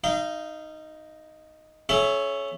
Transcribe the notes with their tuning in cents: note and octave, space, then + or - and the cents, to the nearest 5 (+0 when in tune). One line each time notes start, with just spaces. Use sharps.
D#4 +0 F5 -40
C#4 +0 A4 -45 E5 +10